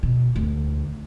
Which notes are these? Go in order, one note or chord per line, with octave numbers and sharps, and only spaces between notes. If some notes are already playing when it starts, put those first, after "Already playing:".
B2
D2